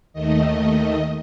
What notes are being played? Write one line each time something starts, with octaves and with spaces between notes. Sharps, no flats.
D#2 D#3 A3 D#5